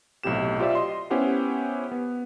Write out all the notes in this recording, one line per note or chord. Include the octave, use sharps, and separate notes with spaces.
B1 A2 C3 G4 E7
F4 G4 C5 D5 E5
D#5 C6
B3 C#4 E4 G4 C5 F#5
B3